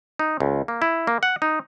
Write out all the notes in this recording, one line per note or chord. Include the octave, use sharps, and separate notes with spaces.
D#4
C#2
A#3
E4
A#3
F#5
D#4